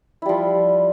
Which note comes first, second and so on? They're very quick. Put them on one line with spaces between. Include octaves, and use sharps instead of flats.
E4 G3 F3